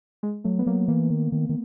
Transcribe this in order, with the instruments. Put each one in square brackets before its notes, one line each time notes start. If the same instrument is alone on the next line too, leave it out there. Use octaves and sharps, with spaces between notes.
[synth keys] G#3
[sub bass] F#3 [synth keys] A3
[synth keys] B3
[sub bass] F#3 [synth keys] A#3
[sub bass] E3 [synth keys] A#3
[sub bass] D#3
D#3
D#3